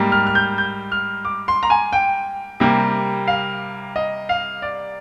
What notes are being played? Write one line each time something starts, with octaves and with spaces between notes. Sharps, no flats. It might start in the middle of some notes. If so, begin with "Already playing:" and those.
Already playing: G#2 G3 A#3
F6
F6
G6
G6
F6
D6
C6
A#5
G#5
G5
C3 G3 A#3
F5
D#5
F5
D5